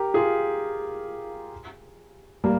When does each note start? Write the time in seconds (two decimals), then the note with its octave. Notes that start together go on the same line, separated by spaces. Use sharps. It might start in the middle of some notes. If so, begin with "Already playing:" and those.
Already playing: G4 A#4
0.14 F4 G#4
2.44 G3 A#3